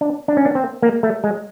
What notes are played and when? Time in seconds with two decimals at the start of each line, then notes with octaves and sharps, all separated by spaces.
0.01 D4
0.28 D4
0.37 C#4
0.45 D4
0.55 C4
0.82 A#3
1.03 A3
1.24 G#3